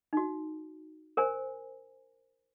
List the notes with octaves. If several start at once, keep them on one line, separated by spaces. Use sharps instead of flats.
D#4 F#4
A#4 C5 G#5